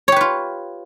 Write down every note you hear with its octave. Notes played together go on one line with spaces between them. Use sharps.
F4 G4 B4 C#5